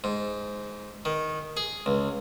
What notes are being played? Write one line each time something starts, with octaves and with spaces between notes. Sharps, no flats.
G#2
D#3
G#4
C#2